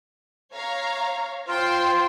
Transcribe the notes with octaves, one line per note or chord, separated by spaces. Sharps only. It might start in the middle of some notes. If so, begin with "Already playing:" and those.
C#5 F5 A#5
F4 C5 G5 C6